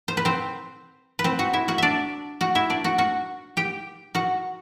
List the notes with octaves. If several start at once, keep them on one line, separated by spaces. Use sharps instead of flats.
C5
B4
C4 C5
B4
C4 C5
F#4 F#5
E4 E5
F#4 F#5
D4 D5 E5
F#4 F#5
E4 E5
D4 D5
F#4 F#5
F#4 F#5
G4 G5
F#4 F#5